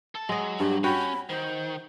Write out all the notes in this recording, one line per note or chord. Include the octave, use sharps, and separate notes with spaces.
A4 A5
F#3 G#3 D#5
G2 G4
C#4 F#4 G5 B5
D#3 C5